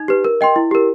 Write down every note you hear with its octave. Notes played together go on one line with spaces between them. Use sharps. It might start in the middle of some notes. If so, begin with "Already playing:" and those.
Already playing: D#4
G4 B4
A#4
D#5 G5 C6
E4
G4 A#4